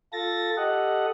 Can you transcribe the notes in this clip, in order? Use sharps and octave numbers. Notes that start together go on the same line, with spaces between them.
F4 A4 A6 A#6
G4 A4 D#5 F#5